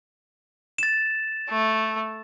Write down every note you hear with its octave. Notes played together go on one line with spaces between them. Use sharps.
A6 E7
A3